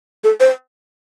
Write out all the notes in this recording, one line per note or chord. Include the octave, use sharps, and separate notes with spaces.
A4
C5